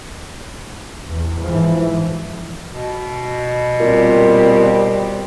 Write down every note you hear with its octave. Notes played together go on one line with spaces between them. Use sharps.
E2
G#2 E3 F3
B2
A#2 G3 B3 C4